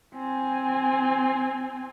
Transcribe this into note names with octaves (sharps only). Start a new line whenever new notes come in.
C4 G#5